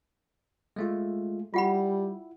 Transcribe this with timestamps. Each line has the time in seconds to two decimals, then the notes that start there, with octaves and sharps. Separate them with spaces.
0.76 G#3 A3 F4
1.54 G3 E4 F4 F#5 B5